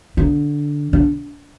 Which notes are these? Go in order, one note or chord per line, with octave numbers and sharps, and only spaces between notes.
D3
D3